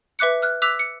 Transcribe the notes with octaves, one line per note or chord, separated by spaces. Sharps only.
B4 E5 D6 F#6 C#7
F6 F#6
D6 E6 F#6 B6 F7
C#7